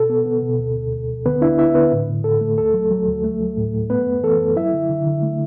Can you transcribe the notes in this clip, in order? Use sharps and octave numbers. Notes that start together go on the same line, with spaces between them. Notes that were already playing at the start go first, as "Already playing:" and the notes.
Already playing: B2 A4
B3
B3
B2
D2
D2
D2
D2
D3 B3 B4
D4 E4 E5
B3 E4 E5
D3 B3 B4
A2
A2
A2 A4
A3
D2 A4
F#3
F#3
D2
A3
F#3
A2
A2
A3 B3 B4
F#2
E3 A4
F#2
F#3 E4 E5
D3
D3
D3
A3